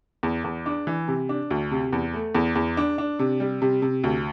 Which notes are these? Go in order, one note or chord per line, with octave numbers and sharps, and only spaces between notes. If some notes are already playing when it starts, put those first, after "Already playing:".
E2
E2
D4
E3
C3
D4
D2
C3
E2
A3
E2
E2
D4
D4
C3
G3
C3
C3
D2